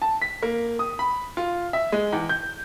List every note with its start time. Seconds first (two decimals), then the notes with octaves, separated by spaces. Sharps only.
0.02 A5
0.22 B6
0.43 A#3
0.79 D#6
0.99 B5
1.37 F4
1.73 E5
1.92 G#3
2.13 E2
2.29 G6